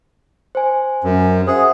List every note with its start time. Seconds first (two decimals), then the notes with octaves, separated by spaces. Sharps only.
0.55 C5 G#5
1.04 F#2
1.47 G#4 C5 E5 F#5